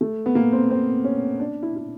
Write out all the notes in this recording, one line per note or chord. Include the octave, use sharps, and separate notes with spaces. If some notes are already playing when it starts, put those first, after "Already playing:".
A3
B3
A#3
C4
C4
C#4
D4
E4
E4